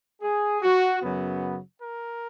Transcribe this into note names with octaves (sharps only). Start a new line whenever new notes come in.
G#4
F#4
F#2 C#3 F#3 B3
A#4